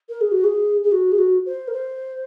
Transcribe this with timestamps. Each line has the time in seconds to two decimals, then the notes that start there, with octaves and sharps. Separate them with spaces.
0.09 A#4
0.21 G#4
0.32 F#4
0.44 G#4
0.84 G#4
0.92 F#4
1.12 G#4
1.18 F#4
1.46 C5
1.68 A#4
1.73 C5